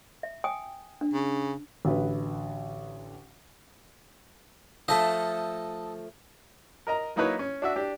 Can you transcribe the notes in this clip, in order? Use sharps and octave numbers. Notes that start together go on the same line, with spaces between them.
E5
G5 G#5 D#6
D4
C#3
A1 D3 F#4 B4
F3 A3 A4 D#5
A#4 D#5 A#5
F#3 A#3 D#4 E4 B4 C#5
C#4
D4 F#4 E5
D4 G4